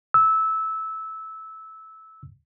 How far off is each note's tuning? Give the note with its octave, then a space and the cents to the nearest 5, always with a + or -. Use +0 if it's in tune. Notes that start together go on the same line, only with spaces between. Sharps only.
E6 -15